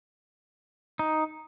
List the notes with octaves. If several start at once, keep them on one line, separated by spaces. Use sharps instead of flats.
D#4